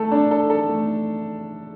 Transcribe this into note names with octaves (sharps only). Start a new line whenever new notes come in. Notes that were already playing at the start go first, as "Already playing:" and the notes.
Already playing: A3 A4
D4
A4
A4
A3